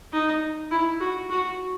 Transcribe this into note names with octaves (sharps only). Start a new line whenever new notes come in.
D#4
E4
F#4
F#4